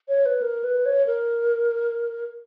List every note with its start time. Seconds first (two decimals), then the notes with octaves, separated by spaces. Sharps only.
0.09 C#5
0.26 B4
0.42 A#4
0.64 B4
0.86 C#5
1.07 A#4